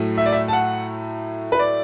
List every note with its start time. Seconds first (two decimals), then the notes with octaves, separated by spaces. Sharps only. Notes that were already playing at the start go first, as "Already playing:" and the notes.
Already playing: A2 F#3 A3
0.18 E5
0.26 D5
0.33 E5
0.48 A5
0.53 F#5
1.52 B4
1.59 D5